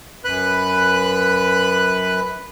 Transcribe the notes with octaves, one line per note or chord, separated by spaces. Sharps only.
F#2 B4 B5 F#6